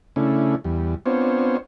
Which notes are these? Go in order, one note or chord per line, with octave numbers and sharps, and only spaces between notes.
C#3 A3 C#4 D4 E4
E2 G3
B3 C4 D4 F4 C5 C#5